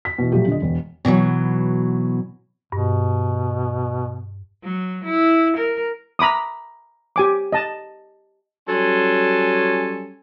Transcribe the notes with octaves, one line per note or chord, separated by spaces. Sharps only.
B6
B2 E3
A#2 F3 F#3 A3 F4 G4
D3 D#5
E1
B2 D3 E3 F#3
G2 B2
F#3
E4
A#4
A#5 B5 D6 D#6
G4 G#5 D6
D#5 A5
F#3 G3 C#4 A4 G#5 C6